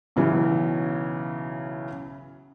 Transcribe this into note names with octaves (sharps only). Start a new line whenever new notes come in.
B1 C#3 E3 F#3